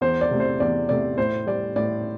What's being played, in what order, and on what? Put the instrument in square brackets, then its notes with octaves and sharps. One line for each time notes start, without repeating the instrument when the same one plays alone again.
[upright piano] E2 C5
D5
C3 A3
C5
E2 D5
C3 A3 D5
A2 C5
G3 D5
A2 D5